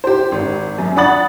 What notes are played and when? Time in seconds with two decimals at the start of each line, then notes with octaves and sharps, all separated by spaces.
0.04 G4 C5
0.32 G#1
0.78 F#2
0.96 D4 F#5 B5 D#6 A6 F#7